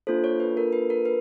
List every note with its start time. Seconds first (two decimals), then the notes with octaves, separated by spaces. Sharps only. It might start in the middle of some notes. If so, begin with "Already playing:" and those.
0.07 A#3 D4 F4 A4 C5
0.24 C#5
0.40 B4
0.57 A#4
0.73 B4
0.90 A#4
1.05 B4